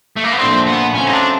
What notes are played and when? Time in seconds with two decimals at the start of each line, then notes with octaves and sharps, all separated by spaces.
0.17 A3
0.24 A#3
0.33 B3
0.39 A#2 F3 A3 C4 D4
0.67 B3
0.94 C#3 F#3 A3 C4 C#4
1.07 D#4
1.13 D4